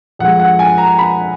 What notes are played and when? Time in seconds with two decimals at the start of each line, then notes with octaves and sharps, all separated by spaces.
0.19 F2 F3 G#3 F#5
0.40 F#5
0.59 G#5
0.78 A#5
0.98 B5